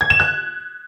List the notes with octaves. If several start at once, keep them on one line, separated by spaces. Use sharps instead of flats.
G#6
E7
F#6